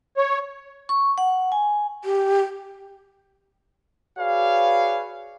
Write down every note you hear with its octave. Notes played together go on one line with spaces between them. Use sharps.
C#5
C#6
F#5
G#5
G4
F#4 G#4 B4 C#5 D5 F5